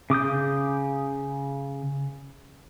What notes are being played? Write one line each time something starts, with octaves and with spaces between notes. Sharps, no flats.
C#3 D6 D#6 G6